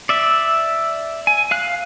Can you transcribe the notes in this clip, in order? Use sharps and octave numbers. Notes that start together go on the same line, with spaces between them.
D5 E5
G#5
F5 F#6